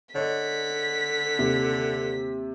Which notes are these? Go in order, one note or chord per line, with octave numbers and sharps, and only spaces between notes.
D3 C#5 D#5 B6
D#2 C3